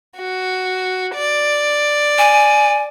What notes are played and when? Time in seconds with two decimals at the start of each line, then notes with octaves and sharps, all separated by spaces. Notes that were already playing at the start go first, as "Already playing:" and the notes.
0.18 F#4
1.15 D5
2.18 G#5